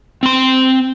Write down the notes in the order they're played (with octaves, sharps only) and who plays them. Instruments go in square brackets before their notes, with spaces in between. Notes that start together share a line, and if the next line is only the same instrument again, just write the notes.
[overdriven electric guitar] C4 C6